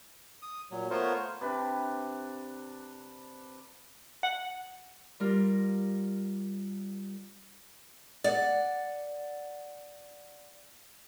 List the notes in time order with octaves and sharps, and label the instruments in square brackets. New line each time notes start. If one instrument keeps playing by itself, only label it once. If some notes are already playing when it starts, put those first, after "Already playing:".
[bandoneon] D#6
A#2 F#3
A3 B3 F4 A#4 C5 C#5
[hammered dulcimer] C3 D4 B4
[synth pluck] F#5
[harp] G3 F4 A#4
[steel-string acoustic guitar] D5 F#5